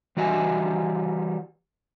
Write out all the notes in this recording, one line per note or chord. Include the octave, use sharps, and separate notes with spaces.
E3 G3 F#4 D#5 E5 G#5